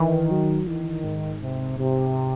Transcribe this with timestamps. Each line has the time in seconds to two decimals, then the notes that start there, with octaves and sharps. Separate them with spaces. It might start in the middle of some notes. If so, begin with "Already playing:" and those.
Already playing: D#3 E3
0.31 F#3
0.67 D#3 E3
1.04 G#2
1.42 C3
1.78 C3